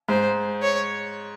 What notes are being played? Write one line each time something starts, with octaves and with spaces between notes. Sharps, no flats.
G#2 C5
C#5